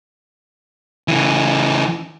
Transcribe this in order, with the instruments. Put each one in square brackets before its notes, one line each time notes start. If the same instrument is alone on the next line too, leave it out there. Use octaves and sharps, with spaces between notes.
[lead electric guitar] C#3 E3